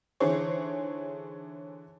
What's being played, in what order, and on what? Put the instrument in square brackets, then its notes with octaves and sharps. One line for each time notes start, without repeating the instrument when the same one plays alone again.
[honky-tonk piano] D3 E3 D#4 G#4 C5 C#5